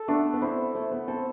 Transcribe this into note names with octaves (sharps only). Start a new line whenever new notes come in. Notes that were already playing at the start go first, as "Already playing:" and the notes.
Already playing: A4
A3 B3 D4
B3
C4 E4
A3 C4
B3
C4 A4